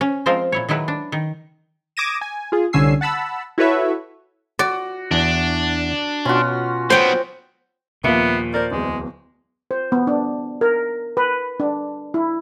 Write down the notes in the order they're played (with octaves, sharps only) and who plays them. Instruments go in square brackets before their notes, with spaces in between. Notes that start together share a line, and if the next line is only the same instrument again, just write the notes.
[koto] C#4
F3 G#3 C4 F4 A#4 C5
A#2 E4 C#5
D#3 F#3 G#3 E4 B4
D4
D#3
[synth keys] D6 D#6 G#6 A#6 D#7 E7
G#5
F4 G#4
C2 D3 C#4 G#5 E6 C7
F#5 A5 B5 E6
E4 F#4 A4 B4 C#5 E5
[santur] F#4 [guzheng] D5
[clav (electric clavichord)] E2 [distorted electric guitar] D4
[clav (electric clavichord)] B2 [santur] C#4 F4 F#4
[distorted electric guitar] F#3 B3 [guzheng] C5 G5
[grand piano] D#2 F3 [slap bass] A#2 [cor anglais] B3 [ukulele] E5 F5
[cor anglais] A#4 [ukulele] C5 D5
[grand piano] D1 E2 [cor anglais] G#3
[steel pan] C5
B3
D4
A#4
B4
D4
E4